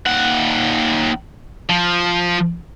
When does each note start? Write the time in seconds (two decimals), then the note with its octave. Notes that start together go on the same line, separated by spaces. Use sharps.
0.06 D#2 F#5
1.69 F3